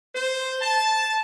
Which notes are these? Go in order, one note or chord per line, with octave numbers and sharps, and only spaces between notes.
C5
A5